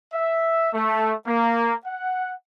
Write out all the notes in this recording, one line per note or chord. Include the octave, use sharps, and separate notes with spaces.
E5
A3
A#3
F#5